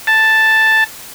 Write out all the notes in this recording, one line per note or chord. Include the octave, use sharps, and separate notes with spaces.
A5